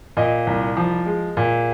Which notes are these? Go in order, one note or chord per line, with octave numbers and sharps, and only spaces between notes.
A#2 D#5
C2
F3
G#3
A#2